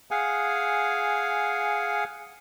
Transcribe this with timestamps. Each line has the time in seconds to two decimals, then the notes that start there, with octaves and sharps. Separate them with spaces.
0.11 G#4 F5 F#5 G#5